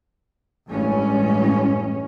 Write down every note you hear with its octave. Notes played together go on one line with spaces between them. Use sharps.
A1 G2 G#3 C#4